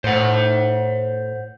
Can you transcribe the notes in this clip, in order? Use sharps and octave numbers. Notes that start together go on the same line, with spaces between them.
A2 C5 F#5